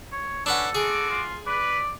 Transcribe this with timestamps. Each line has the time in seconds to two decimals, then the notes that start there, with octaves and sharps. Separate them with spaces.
0.12 C#5
0.46 C#4 D4 A4 B4 F#5
0.75 G#3 F#4 G#4 D6
1.10 F4
1.47 B4 D5